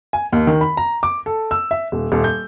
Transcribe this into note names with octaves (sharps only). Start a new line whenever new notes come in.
G#5
D#2
D#3
B5
A#5
D6
A4
E6
E5
D#1
D#1
G6